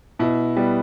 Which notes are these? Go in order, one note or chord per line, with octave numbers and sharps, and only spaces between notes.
B2 E4
G3 B3